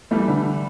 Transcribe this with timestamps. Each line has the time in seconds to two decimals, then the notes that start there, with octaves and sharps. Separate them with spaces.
0.11 E3 G3 A3
0.28 D3